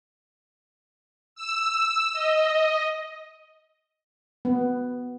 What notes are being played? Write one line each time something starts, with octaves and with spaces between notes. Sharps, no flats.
E6
D#5
B3